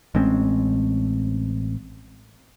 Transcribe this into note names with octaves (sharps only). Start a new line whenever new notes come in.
A1 G#3 C4 C#4